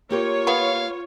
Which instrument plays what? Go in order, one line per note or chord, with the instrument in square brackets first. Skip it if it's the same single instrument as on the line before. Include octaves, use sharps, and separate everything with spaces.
[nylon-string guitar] A#3 G4 A#4 [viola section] F4 C#5
[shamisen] B3 [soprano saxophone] F5